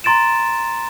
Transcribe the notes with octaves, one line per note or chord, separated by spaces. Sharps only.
A#5 C6 A6 D7 E7